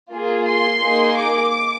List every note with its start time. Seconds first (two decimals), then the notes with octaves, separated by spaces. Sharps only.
0.12 A#3 F4 G#4
0.48 C6
0.83 A#3 D#4 G#4
1.18 D6